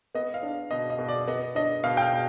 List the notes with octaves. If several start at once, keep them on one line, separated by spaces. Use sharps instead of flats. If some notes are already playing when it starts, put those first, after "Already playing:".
B3 D#5
F5
D4
B2 D#5
D#5
B2
D5
B3 D#5
D4 D#5
B2 F5
G5
F5
B2